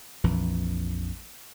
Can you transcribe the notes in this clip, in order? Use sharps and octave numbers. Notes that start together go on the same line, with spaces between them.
A#1 F2 E3